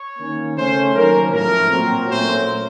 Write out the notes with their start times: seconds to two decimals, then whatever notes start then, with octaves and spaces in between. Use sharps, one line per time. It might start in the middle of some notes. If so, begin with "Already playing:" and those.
Already playing: C#5
0.19 D#3 A#3 C#4
0.56 C#3 A3 C#4 C5
0.94 D#3 F#3 A#3 C#4 A#4
1.33 A2 F3 A3 A#4
1.69 A#2 F#3 C4
2.08 A#2 F#3 A3 C#4 C5